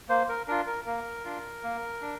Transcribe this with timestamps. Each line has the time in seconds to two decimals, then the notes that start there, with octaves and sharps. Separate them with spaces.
0.09 A#3 C5
0.29 A#4
0.48 D4 F4 A#4
0.67 A#4
0.86 A#3 A#4
1.25 D4 F4
1.64 A#3
2.02 D4